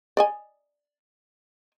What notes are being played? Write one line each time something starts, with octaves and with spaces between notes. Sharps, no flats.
D5 D#5 G#5